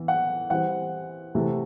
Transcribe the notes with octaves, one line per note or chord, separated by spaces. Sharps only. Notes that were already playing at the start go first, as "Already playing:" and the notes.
Already playing: E3 B3
F#5
E3 G3 C4 F#5
C3 E3 A3